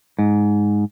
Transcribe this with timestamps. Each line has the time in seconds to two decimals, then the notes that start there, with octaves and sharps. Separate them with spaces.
0.19 G#2